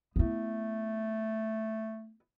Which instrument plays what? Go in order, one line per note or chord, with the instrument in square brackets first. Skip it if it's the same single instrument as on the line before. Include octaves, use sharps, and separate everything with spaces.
[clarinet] A3 [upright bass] B3 E4